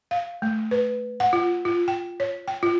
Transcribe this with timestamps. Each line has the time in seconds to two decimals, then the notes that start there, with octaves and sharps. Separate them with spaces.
0.11 F5
0.42 A3
0.71 B4
1.20 F#5
1.33 F4
1.65 F4
1.88 G5
2.20 C#5
2.48 G5
2.63 F4